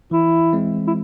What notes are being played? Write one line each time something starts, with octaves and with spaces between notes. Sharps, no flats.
E3 E4
G#3 C4
E4